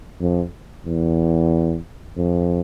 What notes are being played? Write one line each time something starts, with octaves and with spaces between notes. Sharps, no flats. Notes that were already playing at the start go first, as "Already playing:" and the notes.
F2
E2
F2